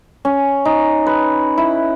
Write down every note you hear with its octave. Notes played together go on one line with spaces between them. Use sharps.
C#4
D#4
B4
E4